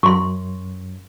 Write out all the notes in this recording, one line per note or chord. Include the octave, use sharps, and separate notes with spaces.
F#2 C6 C#6